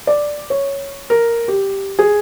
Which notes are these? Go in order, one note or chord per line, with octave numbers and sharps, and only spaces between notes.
D5
C#5
A#4
G4
G#4